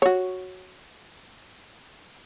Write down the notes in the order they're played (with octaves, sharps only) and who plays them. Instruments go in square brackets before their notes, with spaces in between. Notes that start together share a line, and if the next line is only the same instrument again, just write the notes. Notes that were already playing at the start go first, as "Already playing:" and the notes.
[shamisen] F#4 C#5